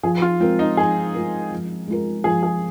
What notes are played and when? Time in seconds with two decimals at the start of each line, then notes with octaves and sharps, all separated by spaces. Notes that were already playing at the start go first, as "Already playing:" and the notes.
0.03 F3 G#4
0.22 F4
0.40 G#3 C4 F4 A#4
0.59 D#4
0.77 F3 G#4
1.14 G#3 F4 A#4
1.51 F3
1.88 G#3 F4 A#4
2.24 F3 G#4
2.43 G#4